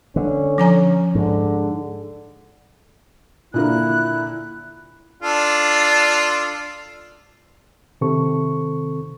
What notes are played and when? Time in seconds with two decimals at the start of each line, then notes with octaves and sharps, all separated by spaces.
0.16 D3 C#4
0.58 F3 G#5 A#5
1.15 G#2 D3
3.54 A#2 D3 A#3 E4 F#6
5.22 D4 F4 A4
8.01 C3 D#3 C4 A4 C#6